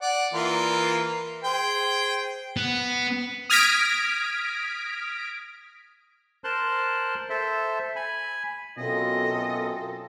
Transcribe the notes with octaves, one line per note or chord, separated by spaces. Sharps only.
D5 F#5
E3 A#3 F4
G#4 C5 G5
B3
D#6 F6 G#6 A#6 B6 D7
A#4 C5 A5 C6 F#6
A4 C5 E5
G#5 B5
F#2 B2 C4 F4 A4 D#5